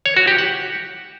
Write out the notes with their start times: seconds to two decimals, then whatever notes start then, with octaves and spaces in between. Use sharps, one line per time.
0.06 C#5
0.17 F#4
0.27 G4
0.38 F#5